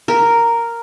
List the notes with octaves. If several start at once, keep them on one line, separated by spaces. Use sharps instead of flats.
A#4